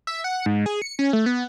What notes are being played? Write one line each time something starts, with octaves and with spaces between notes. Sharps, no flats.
E5
F#5
G#2
G#4
C#7
C#4
A3
B3